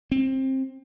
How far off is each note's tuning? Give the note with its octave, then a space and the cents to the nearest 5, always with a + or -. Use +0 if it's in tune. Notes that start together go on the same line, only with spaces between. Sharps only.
C4 +20